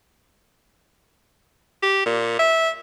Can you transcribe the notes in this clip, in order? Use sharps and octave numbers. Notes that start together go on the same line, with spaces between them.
G4
A#2
E5